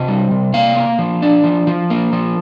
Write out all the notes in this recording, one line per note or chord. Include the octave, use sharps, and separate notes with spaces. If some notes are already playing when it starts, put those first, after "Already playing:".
Already playing: C3 D#5
G3
C3
A#3 F5
A#3
F3
D4
F3
F3
A#3
F3